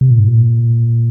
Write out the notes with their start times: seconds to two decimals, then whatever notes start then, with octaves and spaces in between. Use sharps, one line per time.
0.01 C3
0.11 A#2
0.19 G#2
0.28 A#2